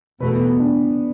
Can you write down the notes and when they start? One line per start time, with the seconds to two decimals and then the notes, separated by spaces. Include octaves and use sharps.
0.20 E2 B2 A3 B4
0.34 B3
0.47 B3
0.59 D4